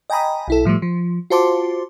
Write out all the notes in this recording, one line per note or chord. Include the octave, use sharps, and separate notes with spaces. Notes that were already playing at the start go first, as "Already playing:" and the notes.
D#5 G5 G#5 A#5 B5 D#6
B1 E4 A4
A2 F3 G3 A3
F3
F4 F#4 C5 A5 C6 D6